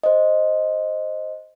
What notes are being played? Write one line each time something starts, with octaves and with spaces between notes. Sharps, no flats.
C5 D#5